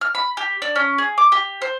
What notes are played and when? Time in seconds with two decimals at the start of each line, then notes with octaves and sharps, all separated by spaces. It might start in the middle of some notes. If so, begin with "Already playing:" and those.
0.01 F6
0.15 B5
0.37 G4
0.62 D4
0.76 C#4
0.98 G#4
1.18 D6
1.32 G4
1.62 C5